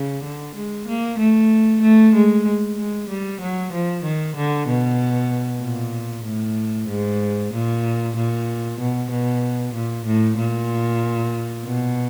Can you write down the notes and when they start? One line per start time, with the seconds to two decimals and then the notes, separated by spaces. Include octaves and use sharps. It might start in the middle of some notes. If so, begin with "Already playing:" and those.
Already playing: C#3
0.23 D3
0.55 G#3
0.87 A#3
1.18 A3
1.82 A3
2.14 G#3
2.78 G#3
3.09 G3
3.40 F#3
3.72 F3
4.03 D#3
4.36 D3
4.68 B2
5.62 A#2
6.25 A2
6.88 G#2
7.53 A#2
8.16 A#2
8.80 B2
9.11 B2
9.74 A#2
10.06 A2
10.37 A#2
11.65 B2